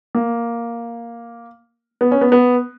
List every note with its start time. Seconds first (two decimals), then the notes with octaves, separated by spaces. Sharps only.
0.15 A#3
2.01 B3
2.12 C#4
2.21 B3
2.32 B3